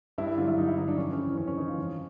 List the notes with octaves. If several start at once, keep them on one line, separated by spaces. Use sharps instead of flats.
G2 E4
E4
D3 F#3 F4
E4
G2 D#4
E4
D3 F#3 D#4
D4
F2 C#4
C#4
C#3 E3 C4
F2 C#4
C#4
C#3 E3 D#4
F4
F2